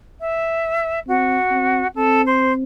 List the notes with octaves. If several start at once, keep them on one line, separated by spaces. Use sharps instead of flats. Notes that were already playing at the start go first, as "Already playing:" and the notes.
E5
C4 F#4
C4
C4 A4
C5